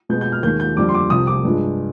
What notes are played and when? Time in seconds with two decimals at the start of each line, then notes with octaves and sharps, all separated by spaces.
0.09 B2 G#3 B3 G6
0.21 G6
0.32 F6
0.43 D#2 D#3 G#3 G6
0.60 G6
0.76 F2 D3 G3 D6
0.89 C6
0.94 D6
1.10 C2 C3 F3 D#6
1.27 D6
1.45 G2 F3 G#3